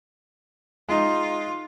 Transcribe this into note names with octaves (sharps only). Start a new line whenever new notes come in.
G#3 D#4 F4